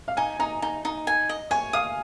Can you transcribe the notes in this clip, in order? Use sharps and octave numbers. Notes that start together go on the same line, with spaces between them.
F5
D#4 G#5
D#4 A#5
D#4
D#4
G#5
D#5
C#5 G#5
F5 D#6